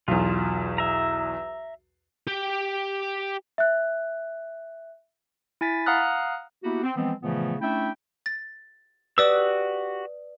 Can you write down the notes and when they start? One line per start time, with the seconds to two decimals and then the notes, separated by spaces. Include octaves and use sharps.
0.08 B1 E2 F4
0.78 E5 A#5
2.27 G4 G5
3.58 E5 F#6
5.61 E4 G#5 A6 B6
5.86 F5 F#5 A#5 D#6 F6 F#6
6.64 A#3 B3 E4 F#4 G4
6.83 C4
6.97 E3 F3 G#3 B3 C4
7.22 A#2 C#3 E3 F3 A3 B3
7.61 A3 C#4 D4 E4 E5 G5
8.26 A6
9.18 F#4 G4 B4 D5 D#6 E6